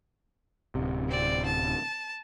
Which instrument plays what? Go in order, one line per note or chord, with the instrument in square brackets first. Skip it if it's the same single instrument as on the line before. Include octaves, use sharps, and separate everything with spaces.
[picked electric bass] D1 C3
[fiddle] C4 D5
A5